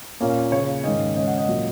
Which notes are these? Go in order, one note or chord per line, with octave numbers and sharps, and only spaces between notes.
A#2 A#3 C#4
C#3 A#3 C#4 C#5
G#2 D#3 A#3 C#4 D#5
C#3 G#3 C#4 D#5
F#5
D#5
A#2 F#3 A#3 C#4